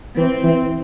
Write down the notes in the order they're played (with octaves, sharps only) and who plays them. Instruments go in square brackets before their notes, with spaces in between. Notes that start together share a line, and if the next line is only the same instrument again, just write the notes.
[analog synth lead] E3 [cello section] C4
[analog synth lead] E3